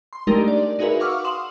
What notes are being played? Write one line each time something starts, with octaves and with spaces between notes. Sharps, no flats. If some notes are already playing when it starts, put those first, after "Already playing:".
C6
G#3 A3 D4 D#4 G4 A#4
D5
D#4 F#4 G#4 A#4 B4 E5
F5 F#5 C#6 D6 E6 F6
F#5 C6 D#6 E7 F#7